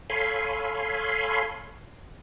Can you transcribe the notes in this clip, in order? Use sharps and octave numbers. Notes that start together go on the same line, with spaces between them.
A4 C#5 F5 G#5 B5 C6